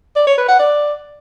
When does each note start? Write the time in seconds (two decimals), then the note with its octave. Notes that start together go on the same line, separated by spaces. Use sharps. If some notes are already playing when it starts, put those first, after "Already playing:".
0.16 D5
0.27 C#5
0.38 B4
0.48 F#5
0.59 D5